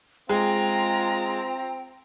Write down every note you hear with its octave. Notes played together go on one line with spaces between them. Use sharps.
G#3 C4 F4 G5 A#5